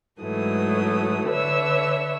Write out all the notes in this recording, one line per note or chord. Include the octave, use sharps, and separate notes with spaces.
G#2 E3 F#3 A3 D#6
D3 B4 C#5 E5 E6